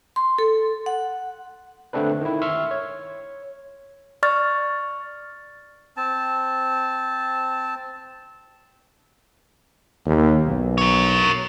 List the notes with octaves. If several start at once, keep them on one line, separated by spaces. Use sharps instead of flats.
C6
A4
F#5
D3 A3 C4 D4 B4
D#3 E4
E5 C6 C#6 E6 F6
C#5
D5 C#6 F6 A6
C4 A5
D#2
B1
A#4 C#5